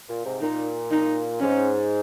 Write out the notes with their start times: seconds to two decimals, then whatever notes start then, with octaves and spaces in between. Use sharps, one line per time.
0.08 A#2
0.25 G#2 C3
0.41 A#2 D#4
0.91 D#4
1.40 G#2 C#4